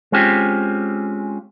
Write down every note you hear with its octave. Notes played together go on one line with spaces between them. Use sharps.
G#3 C4 C#4 F4 G4